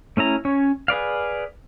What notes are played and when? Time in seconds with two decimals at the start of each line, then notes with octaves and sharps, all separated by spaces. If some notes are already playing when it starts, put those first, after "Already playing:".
0.17 A3 C#4 E4 A#5
0.45 C#4 C#5
0.88 G#4 B4 D5 F5